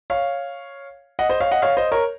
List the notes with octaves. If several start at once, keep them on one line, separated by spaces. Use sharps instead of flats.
C#5 F5
D#5 F#5
C5 D#5
C#5 F5
D#5 F#5
C#5 F5
C5 D#5
A#4 C#5